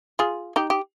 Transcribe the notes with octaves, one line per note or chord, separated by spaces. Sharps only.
F4 G#4
D#4 G4
G4